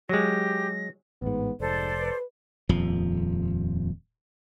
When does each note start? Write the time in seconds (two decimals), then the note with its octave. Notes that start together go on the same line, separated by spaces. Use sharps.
0.09 F#3 G#3 G4 A#6
1.22 A1 G#2 B3
1.60 F1 G#2 A4 C5 D5
1.98 B4
2.69 D#1 F2 F3